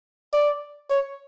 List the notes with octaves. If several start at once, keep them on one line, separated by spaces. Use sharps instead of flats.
D5
C#5